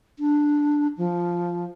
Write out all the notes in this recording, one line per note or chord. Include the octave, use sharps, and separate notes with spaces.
D4
F3